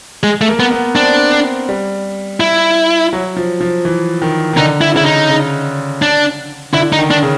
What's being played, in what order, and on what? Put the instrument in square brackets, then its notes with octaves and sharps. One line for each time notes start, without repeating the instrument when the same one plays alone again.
[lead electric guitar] G#3
A3
[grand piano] A#3
[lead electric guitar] B3
[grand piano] B3
[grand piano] C4 [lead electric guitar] D4
[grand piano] C4
G3
[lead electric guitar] E4
[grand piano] F#3
F3
F3
E3
D#3
D#3
[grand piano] D3 [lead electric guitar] D#4
[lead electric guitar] E4
[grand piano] C#3 [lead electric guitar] E4
[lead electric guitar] D#4
[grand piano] C#3
[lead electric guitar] D4
[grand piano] D3 [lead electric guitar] E4
[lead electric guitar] D#4
[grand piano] D#3
[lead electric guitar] D4
[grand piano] C#3